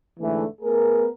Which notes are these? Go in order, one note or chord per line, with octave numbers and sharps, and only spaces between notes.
G#2 D3 E3 A3
A3 B3 G#4 A#4